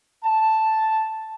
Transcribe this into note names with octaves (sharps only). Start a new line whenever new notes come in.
A5